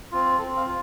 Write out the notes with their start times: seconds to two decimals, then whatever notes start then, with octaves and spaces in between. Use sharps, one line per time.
0.12 C4 F4
0.38 C4 A4
0.57 F5
0.66 F4